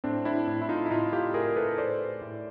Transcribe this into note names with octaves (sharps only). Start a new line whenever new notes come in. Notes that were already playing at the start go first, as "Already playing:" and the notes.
A2 C4 D4
D4 E4
A2
E4
D#4 F4
E4
A2 D#4 F4
F4 G4
A2 G#4 A#4
A4 B4
A2 C5 D5
A2